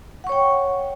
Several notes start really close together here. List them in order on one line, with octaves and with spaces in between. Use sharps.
F#5 C#6 C#5 G5